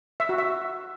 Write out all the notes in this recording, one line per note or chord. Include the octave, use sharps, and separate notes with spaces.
E5
F#4
E5